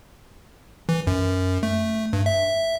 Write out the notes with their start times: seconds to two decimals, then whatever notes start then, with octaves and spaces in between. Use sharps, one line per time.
0.89 E3
1.07 F#2
1.63 A3
2.13 G2
2.26 E5